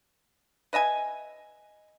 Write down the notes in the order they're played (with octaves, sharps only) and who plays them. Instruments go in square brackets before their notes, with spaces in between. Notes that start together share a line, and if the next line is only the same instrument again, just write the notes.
[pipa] B4 D#5 E5 G#5